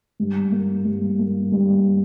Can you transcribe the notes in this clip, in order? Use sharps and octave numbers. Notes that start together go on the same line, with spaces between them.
G2
A#3
G2
A#3
G2